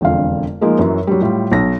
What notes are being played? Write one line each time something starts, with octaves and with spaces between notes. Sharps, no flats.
E1 F2 D3 F5
F3 G#3 A#3 D#4
F#2 E3 F#3
F#3 G3
A2 G3 F4
B1 A#6